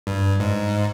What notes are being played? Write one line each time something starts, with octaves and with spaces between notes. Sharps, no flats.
G2
G#2